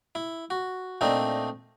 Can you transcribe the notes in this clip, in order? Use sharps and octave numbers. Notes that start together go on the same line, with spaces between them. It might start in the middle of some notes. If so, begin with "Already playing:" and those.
E4
F#4
A#2 A3 C4 D4 D#4